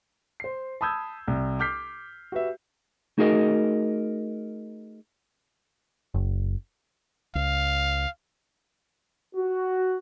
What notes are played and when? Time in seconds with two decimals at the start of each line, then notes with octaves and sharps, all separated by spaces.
0.40 C5 C7
0.81 A5 B5 D#6 E6 G6 G#6
1.28 C2
1.59 D6 F6 G6 B6 C7
2.32 F#4 G4 B4 E5
3.18 A3 D#4 F#4 G#4 A#4 D#5
6.14 F#1
7.35 C#2 F5
9.36 F#4